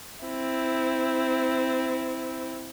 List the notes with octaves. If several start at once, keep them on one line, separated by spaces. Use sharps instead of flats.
C4 E4